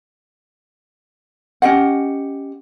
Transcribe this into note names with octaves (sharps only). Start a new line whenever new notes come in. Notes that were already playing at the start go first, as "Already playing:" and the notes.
C#4 G4 D#5 F#5